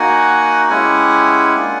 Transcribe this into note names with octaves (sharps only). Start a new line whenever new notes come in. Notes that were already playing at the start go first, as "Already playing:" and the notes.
Already playing: A#3 D#4 F#4 F#5 G#5
G#3 C#4 E4 G4 F#5 G#5
A#3 D4 F4